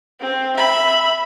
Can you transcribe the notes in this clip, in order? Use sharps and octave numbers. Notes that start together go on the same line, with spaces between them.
C4
E5 B5